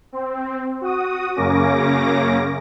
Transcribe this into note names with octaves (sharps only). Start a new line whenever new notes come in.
C4
F#4 D#6
F#2 C#3 A#3 C#4 D6 A#6